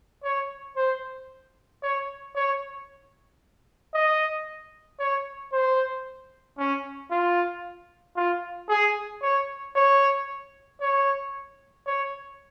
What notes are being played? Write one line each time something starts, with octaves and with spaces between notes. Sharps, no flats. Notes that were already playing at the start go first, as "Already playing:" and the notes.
C#5
C5
C#5
C#5
D#5
C#5
C5
C#4
F4
F4
G#4
C#5
C#5
C#5
C#5